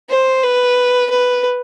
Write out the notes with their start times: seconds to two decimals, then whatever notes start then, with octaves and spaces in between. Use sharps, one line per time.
0.09 C5
0.43 B4
1.10 B4